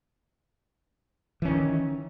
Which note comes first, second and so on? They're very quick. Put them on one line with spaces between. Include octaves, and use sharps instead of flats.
E3 C#4 D#3